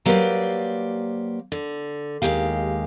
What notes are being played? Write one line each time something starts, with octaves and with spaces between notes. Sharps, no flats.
F#3 A#3 G4 B4 C5 D5
D3
D#2 G#2 G#3 G4 F5